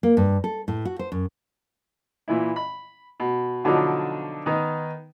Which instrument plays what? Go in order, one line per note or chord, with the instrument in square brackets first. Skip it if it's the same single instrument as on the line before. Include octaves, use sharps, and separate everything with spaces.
[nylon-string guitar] A#3
G2
A4
A2
F#4
C5
F#2
[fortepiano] A#2 E3 E4
B5
B2
B2 D3 F3 F#3 D4 D#4
D#3 B3 D#4